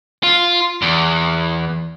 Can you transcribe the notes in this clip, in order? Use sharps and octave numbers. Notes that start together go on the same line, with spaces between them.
F4
E2